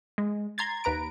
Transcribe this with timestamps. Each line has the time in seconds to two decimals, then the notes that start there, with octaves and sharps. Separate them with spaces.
0.18 G#3
0.58 A#5 C6 G#6 A6
0.84 D#2 B4 A#5 D7